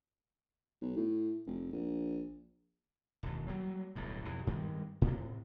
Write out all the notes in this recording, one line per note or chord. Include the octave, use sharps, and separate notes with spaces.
B1
A2
F1
A#1
E1 D#2
F#3 G3 A#3
D1 B1 G2
B1 F2 E3
G2 D#3 G3 G#3
A2 C3